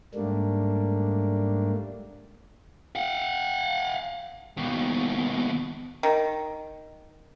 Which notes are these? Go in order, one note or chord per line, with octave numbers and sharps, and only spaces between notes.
G#2 G3 A3 A#3 D4
F5 F#5
D#2 B2
D#3